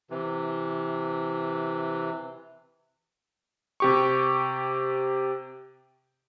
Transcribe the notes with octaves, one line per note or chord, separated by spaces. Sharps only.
C3 E3
C3 G4 C#6